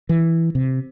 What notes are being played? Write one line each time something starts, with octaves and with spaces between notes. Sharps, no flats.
E3
C3